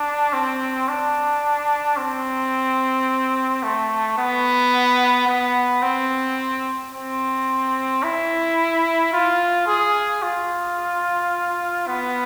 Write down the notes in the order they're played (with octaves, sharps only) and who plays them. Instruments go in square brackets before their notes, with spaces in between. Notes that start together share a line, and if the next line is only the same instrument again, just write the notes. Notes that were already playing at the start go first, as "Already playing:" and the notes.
Already playing: [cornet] D4
C4
D4
C4
A3
B3
B3
C4
C4
E4
F4
G#4
F4
B3